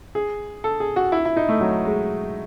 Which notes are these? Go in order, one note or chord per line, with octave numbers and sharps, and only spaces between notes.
G#4
A4
G#4
F#4
E4
E4
D#4
A3
F#3
G#3